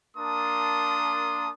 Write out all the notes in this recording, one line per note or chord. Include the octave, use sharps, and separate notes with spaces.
A#3 D4 A#4 A5 C6 D#6